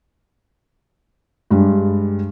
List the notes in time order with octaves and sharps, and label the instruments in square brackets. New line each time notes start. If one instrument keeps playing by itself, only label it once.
[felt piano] G2 G3 G#3